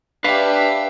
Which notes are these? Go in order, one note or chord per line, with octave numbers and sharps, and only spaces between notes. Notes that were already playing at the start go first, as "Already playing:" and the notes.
D4 G4 B4 E5 F5